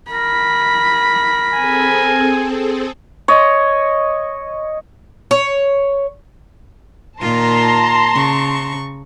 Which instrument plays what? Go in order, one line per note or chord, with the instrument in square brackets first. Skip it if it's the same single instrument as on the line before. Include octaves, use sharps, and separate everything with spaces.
[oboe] A#4 [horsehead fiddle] B5
[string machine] C4 G#4 A4 [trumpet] G#5
[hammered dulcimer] C#5 D#5
[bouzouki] C#5
[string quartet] A#2 D#3 F4 [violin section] A5 A#5 C6
[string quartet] C#3 C#6